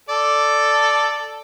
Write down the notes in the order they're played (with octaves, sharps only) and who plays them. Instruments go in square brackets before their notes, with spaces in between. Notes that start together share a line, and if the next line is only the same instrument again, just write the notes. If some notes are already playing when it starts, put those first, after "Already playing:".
[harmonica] A4 D5